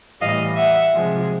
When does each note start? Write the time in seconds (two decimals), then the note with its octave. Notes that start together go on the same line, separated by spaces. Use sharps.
0.21 A2 E3 G3 D#5 F5
0.56 E5 F#5
0.94 C3 F3 G#3